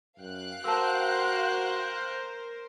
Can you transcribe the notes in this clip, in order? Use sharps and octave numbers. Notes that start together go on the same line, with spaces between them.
F#2 F5 G5 F#6
F#4 A#4 C5 A5 E6